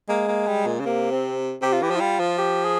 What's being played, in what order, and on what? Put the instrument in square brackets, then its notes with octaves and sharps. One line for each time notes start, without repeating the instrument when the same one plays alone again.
[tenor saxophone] G#3 [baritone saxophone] A#3
[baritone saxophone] A#3
G3
A#2
C#3
[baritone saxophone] C3 [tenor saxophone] A#3
[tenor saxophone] C4
[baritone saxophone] C3 [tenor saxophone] G4
[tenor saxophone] F4
[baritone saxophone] E3 [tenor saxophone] G4
[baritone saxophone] F3
[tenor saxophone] E4
[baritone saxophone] G3 [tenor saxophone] F4
[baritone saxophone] F3
[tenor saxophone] G4
G#4